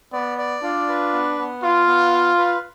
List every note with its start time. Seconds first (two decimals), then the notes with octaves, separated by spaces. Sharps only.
0.13 B3 D5
0.38 D5
0.63 D4 F4
0.89 B4
1.13 B3
1.39 B3
1.63 F4 F5
1.88 B3
2.13 F5
2.38 B4